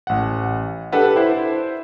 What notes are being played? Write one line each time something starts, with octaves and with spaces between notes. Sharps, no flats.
A1 F#5
D4 G4 A4 B4 F#5
E4 C5